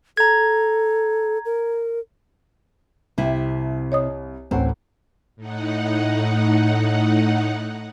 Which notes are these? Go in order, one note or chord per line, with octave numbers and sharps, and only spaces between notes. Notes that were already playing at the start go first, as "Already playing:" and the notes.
A4 A#5 G#6
A#4
C2 C3 E4
C#5 D#5 D#6
A1 D2 A2 C4 A4 F#5
A2 D#4 F#5